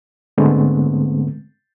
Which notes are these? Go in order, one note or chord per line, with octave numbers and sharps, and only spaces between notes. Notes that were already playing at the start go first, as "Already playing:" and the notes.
G#2 D3 G#3 A3 B3 C4